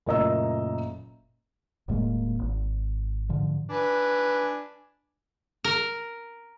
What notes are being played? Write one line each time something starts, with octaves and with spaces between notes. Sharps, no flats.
F#1 A#2 A3 D#5 A#5 E6
D#1 A2 G#3 A#3
G#1
G#2 D3 F3
D4 B4 G#5
A#4